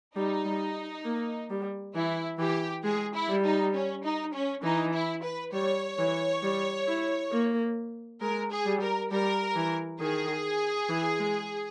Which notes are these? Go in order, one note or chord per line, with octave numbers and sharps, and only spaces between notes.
G3 D#4
G3
A#3
G3
E3 E4
E3 G4
G#3 G#4
E4
G3
D#4
C#4
D#4
C#4
E3 D#4
E4
B4
G3 C#5
E3
G3
E4
A#3
G#3 A#4
G#4
G3
A#4
G3 A#4
E3
D#3 G#4
E3
G#3